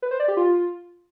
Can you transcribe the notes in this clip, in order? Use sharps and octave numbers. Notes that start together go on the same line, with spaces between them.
B4
C5
D5
G4
F4